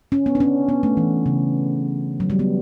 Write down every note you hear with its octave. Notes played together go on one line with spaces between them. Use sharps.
C#4
B3
D4
C#4
B3
A3
E3
C#3
F#3
G3
B3